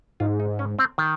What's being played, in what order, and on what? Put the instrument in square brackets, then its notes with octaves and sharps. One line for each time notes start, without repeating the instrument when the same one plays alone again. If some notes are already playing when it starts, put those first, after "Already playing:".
[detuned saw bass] G#2 [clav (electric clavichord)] F4
[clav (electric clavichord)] D#4
C#4
C4
D#3